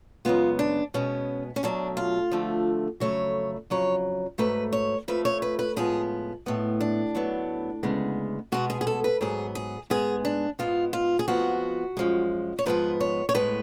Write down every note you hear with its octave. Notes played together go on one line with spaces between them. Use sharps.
F#2 C#3 G#3 B3 F4
D4
B2 G#3 B3 C#4
C#4
B2 F#3 A3 D4
F4
D2 D3 F3 A3
F2 C#3 F#3 A3 C#5
F2 C#3 F#3 C#5
G#2 F#3 A3 B4
C#5
F2 F3 A3 B4
C#5
B4
B4
A2 F3 G#3 B3 G#4
A2 G#3 B3
D4
A2 F#3 B3
D2 C#3 G#3 B3
B2 G#3 B3 F#4
G#4
G#4
A4
B4
G#2 F#3 B3 G#4
G#4
G#2 G#3 B3 G#4
D4
G#2 G#3 B3 F4
F4
G#4
F2 F3 G#3 B3 F#4
F#2 F3 G#3
C#5
G#2 F3 G#3 B3 B4
C#5
C#5
A2 G#3 B3 B4